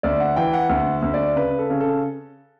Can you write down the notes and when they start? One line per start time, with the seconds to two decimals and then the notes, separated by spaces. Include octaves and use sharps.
0.03 D2 D5
0.20 F#5
0.36 E3 G5
0.53 F#5
0.69 D2 F#5
1.02 D2
1.14 D5
1.36 C#3 B4
1.59 A4
1.70 C#3
1.80 A4